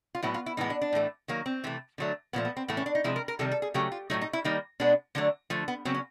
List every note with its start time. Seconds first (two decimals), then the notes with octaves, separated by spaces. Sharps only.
0.15 F4
0.23 A2 F#3 B3 E4
0.34 F4
0.46 E4
0.57 A2 E3 G#3 B3 D#4
0.70 D4
0.81 D4
0.93 A2 E3 A3
1.28 D#3 F#3 A#3
1.46 C4
1.64 C3 E3 A3
1.98 D3 F#3 A3
2.33 A#2 F3 A3 B3
2.45 B3
2.57 C4
2.68 A2 E3 A3 B3
2.77 C#4
2.86 D4
2.95 D#4
3.04 C3 F3 G#3 E4
3.16 A#4
3.28 A#4
3.39 C3 D#3 G3 A4
3.52 A4
3.62 G#4
3.74 C#3 F#3 A3 G4
3.92 F4
4.10 A2 F#3 A3 D#4
4.21 D#4
4.33 E4
4.44 D#3 G3 A#3 D#4
4.80 B2 G#3 B3 D4
5.15 D3 F#3 A3 D4
5.50 D3 F3 A3
5.68 B3
5.85 C#3 F#3 B3 C4
5.94 C#4